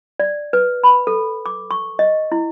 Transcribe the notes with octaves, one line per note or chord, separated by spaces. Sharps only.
D5
B4
B5
A4
D6
C#6
D#5
E4